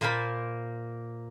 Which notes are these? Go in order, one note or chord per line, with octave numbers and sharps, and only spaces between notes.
A#2 A#3 A#4 C5 A5 B5